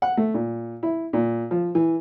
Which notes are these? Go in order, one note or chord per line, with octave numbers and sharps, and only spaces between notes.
F#5
A3
A#2
E4
A#2
F3
E3